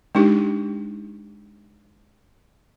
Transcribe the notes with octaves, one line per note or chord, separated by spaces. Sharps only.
G#3 D4 D#4 G4